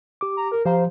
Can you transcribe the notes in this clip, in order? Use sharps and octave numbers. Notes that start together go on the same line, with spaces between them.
G4 D6
A#5
A#4
F3 G4 C5 F5 A#5